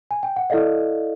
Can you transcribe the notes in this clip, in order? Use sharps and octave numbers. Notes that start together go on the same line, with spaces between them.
G#5
G5
F#5
E4 A4 D5 D#5 F5